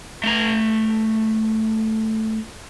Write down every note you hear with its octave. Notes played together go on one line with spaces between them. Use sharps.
A3 A#5